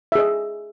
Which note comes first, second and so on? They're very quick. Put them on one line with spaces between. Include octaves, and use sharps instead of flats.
E5 G#4 D#5